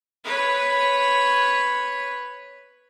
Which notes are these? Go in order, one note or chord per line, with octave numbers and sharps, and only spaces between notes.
B4 C#5